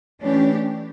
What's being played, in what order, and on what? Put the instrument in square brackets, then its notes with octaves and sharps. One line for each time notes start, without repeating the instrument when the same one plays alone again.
[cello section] E3 A3 D4 G4 [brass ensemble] C#4